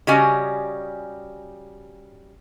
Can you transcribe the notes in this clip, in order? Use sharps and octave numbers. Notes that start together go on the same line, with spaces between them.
C#3 G3 F#4 G4 D#5 G#5